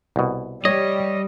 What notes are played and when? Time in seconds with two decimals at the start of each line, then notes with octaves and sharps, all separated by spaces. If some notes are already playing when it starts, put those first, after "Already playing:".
0.16 C2 B2
0.65 G3 C#5 D#5